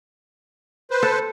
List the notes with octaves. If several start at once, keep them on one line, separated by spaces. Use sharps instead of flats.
B4 C5
A4